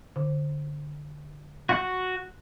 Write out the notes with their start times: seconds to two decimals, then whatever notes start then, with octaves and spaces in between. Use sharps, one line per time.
0.16 D3
1.69 F#4 F#5 F#6